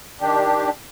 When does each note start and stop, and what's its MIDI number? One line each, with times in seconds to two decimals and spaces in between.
0.21 0.70 51
0.21 0.70 62
0.21 0.70 67